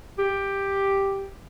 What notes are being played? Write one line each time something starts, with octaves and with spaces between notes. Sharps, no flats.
G4